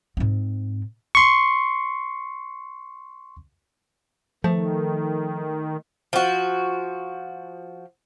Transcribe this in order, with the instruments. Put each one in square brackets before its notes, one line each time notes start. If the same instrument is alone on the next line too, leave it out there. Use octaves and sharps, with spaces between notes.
[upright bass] G#2 C4
[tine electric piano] C6 C#6
[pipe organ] D#3 [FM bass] F3 [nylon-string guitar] A3
[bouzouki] F3 F#4